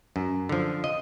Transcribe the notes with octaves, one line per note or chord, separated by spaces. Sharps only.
F#2
D3 F3
D#5